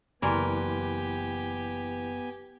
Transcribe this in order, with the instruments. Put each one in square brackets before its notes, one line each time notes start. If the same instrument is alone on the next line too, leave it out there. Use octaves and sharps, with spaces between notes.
[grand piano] F#1 D5 C6 [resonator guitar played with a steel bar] E3 A#4 [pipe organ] B3 G#5 [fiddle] G4